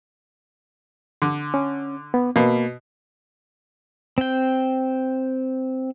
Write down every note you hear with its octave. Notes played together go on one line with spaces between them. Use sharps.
D3
C#4
B3
B2 A#3
C4 G5